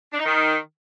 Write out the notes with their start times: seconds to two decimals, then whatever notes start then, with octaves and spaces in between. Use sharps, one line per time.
0.13 D4
0.19 D#4
0.26 D#3